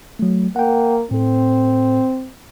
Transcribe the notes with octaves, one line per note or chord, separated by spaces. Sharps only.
F#3 A3
A#3 F#5 G5
A2 C4 A4